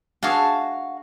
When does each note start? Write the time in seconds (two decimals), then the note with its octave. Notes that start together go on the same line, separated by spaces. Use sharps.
0.23 D4 F#4 G#4 E5 F5